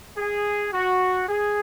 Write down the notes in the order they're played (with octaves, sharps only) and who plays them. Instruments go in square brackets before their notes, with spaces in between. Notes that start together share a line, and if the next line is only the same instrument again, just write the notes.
[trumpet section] G#4
F#4
G#4